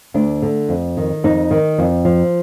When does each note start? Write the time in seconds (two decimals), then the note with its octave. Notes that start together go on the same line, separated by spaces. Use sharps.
0.14 D2 D4
0.42 D3
0.69 F2
0.97 D#3
1.24 F2 D#4
1.51 D#3
1.78 F2
2.05 F3